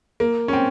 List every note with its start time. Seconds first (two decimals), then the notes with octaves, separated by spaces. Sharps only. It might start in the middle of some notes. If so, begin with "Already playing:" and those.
0.20 A#3
0.48 C#4
0.53 C4